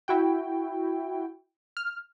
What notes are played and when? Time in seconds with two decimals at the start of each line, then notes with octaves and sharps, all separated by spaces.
0.08 E4 F#4 G5
1.77 F6